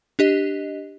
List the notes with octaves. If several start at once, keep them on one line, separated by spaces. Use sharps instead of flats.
D4 G4 D#5